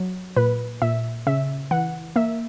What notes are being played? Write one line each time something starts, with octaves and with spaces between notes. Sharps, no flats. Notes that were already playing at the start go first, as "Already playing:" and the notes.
Already playing: F#3
A#2 B4
A#2 E5
C#3 E5
E3 F#5
A#3 E5